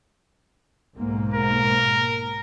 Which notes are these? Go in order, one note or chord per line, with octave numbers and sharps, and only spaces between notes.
B1 G#2 A#3
A#4